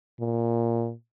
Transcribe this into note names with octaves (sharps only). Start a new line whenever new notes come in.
A#2